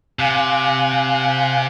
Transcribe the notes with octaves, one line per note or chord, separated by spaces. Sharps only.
C3 F5 G#5 F#6